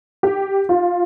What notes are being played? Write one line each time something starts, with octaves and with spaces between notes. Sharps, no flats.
G4
F4